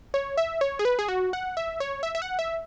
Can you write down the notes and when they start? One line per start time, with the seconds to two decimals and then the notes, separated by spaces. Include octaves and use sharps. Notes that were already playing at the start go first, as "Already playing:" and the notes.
0.14 C#5
0.37 E5
0.61 C#5
0.79 G#4
0.85 B4
0.99 G#4
1.08 F#4
1.33 F#5
1.57 E5
1.80 C#5
2.03 E5
2.15 E5
2.22 F#5
2.39 E5